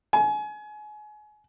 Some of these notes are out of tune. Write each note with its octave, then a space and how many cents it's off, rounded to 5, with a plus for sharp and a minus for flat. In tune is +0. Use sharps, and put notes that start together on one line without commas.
G#5 +30